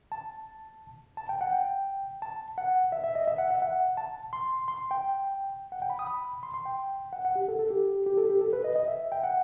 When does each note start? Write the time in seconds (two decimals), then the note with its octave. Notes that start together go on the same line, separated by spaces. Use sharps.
0.12 A5
1.17 A5
1.29 G5
1.41 F#5
1.53 G5
2.22 A5
2.58 F#5
2.92 E5
3.04 E5
3.15 D#5
3.27 E5
3.38 F#5
3.51 E5
3.62 F#5
3.97 A5
4.33 C6
4.68 C6
4.91 G5
5.72 F#5
5.82 G5
5.90 B5
5.99 D#6
6.07 B5
6.43 C6
6.54 C6
6.65 G5
7.13 F#5
7.25 F#5
7.35 G4
7.48 A4
7.59 A4
7.71 G4
8.06 G4
8.17 A4
8.30 G4
8.41 A4
8.53 B4
8.64 D#5
8.76 D#5
8.88 E5
9.12 G5
9.23 F#5